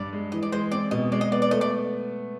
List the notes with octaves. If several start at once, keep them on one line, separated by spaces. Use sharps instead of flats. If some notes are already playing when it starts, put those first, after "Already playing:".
Already playing: G2 D5
G#3
E3 D#5
D5
G#3 C5
C4 D5
B2 D#5
G#3 D5
D#5
B3 D5
D5
A3 D#5
D5